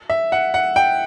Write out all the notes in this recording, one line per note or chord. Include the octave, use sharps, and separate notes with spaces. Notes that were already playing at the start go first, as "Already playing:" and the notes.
E5
F#5
F#5
G5